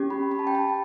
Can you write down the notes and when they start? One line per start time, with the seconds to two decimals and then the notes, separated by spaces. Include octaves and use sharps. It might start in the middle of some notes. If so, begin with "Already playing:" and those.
Already playing: C#4 G4
0.10 B5
0.31 B5
0.39 A5
0.47 G5
0.55 A5